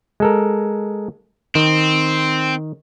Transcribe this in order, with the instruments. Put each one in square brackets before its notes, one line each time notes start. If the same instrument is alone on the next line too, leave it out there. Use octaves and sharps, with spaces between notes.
[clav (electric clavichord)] G#3 A4 A#4
[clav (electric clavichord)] D#3 [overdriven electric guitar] C4